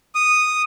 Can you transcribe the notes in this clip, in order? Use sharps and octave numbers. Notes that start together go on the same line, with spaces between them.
D#6